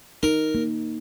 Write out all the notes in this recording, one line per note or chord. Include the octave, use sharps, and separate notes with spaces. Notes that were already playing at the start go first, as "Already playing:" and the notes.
D#4 A#4
A#3